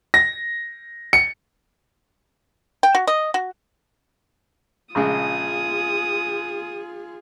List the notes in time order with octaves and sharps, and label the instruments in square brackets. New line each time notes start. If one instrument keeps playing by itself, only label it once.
[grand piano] A#6
C#7
[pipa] G5
F#4
D#5
F#4
[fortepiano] A#1 C#3 G#3 [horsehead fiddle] F4 G#4 [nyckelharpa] D#6